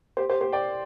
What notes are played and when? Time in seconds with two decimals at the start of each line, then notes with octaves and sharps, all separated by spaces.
0.17 G4 C5
0.29 G4 C5
0.41 G4 C5
0.53 D5 G5